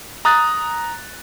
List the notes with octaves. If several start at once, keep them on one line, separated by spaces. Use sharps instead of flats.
A#5 D#6 F#6 A6